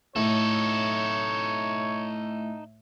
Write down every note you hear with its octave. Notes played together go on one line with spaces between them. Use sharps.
A2 D#4 A4 C#5